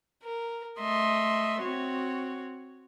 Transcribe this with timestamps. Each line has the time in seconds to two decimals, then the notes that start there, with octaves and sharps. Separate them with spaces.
0.22 A#4
0.80 A3 D#5 E5 C6
1.62 C4 F#4 C#5